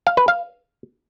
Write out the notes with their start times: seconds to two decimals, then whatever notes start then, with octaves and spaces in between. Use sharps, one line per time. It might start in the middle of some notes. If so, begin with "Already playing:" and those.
0.07 F5
0.17 B4
0.28 F5